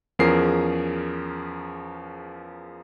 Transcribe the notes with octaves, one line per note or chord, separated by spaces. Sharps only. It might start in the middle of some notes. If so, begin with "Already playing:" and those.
E2 F3 C#4 G#4 A#4 C7